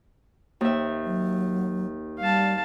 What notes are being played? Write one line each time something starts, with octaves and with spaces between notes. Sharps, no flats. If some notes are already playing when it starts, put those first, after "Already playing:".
D#2 E5
F#3
G3 F5 A5